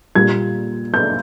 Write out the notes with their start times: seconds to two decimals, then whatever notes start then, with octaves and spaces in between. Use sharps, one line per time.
0.15 A#2 G3 A#3 G#6
0.94 G6